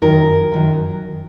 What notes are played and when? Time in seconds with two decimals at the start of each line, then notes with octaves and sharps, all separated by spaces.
0.02 F#2 D#3 F#3 A#4
0.52 F#2 D#3 F#3